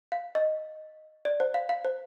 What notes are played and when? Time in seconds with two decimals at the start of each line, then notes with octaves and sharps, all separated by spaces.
0.12 F5
0.35 D#5
1.25 D5
1.40 C5
1.54 F5
1.69 F5
1.85 C5